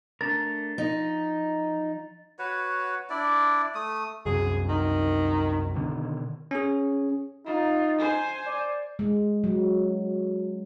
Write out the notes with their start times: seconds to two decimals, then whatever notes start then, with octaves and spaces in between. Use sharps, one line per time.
0.21 A3 D4 A#4 A6
0.78 F3 D#4
2.39 F#4 B4 C#5
3.10 D4 E4 D5
3.75 A3 D#6
4.26 C2 F#2 G#4
4.69 D#3
5.76 B2 D3 D#3
6.51 C#4 G#4
7.46 D#4 F4
7.99 C5 G#5
8.46 D5
8.99 G#3
9.44 F#3